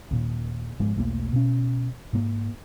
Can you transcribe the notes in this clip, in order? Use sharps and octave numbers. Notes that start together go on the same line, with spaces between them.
D#2 A#2
G#2 F3 G#3
B1 E2 A3 A#3
B2 C#4
G#2 A#3